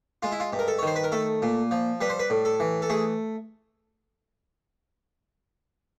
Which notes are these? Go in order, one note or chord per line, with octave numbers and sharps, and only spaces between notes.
G#3 F4
E4
F4
G2
A#4
A4
C#5
D#3 C5
B4
A#4
A3 A4
A#2
F3
G3 B4
C5
B4
A2
A4
E3
A4
A3 G#4